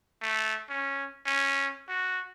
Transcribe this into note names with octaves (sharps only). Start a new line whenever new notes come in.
A3
C#4
C#4
F#4